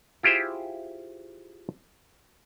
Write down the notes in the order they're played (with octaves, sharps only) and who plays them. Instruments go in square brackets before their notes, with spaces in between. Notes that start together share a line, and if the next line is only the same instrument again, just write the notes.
[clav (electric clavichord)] E4 F4 G4 G#4 C5